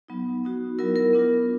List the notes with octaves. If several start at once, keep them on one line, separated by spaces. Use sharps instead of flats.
F#3 B3 D#4
B3 D#4 F#4
F#3 B3 E4 A#4
A#4
B3 D4 F4